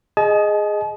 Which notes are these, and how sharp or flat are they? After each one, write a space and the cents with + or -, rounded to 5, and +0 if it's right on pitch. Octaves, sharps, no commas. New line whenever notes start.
G#4 +0 D#5 +0 A5 -45